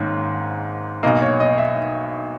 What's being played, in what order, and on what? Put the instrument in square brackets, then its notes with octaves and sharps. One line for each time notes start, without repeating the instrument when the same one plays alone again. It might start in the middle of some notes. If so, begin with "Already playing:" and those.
Already playing: [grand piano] G#1 G#2 D#3 A#3 C#4
B1 B2 A#3 D#5
C#5
D#5
E5